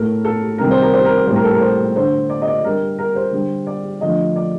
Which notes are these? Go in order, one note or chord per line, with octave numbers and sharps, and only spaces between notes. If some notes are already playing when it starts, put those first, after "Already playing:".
Already playing: A2 A3 A#4
A4
C3 D#3 G3 A#4
C5
A#4
C5
A#4
A2 G3 C5
A#4
A4
A#4
C5
D3 A3 C5
D5
D#5
D5
D3 G3 A#4
A#4
C5
D3 G3
D5
D3 F3 A3 D#5
D5